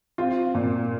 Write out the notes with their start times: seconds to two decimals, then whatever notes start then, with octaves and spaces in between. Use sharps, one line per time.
0.18 C4 F4
0.54 A#2